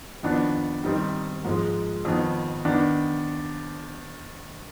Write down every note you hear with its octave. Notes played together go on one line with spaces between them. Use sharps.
F2 D#3 B3 D4
D#3 G3 C4 D#4
G#2 F3 G#3
F2 D#3 B3
D#3 B3 D4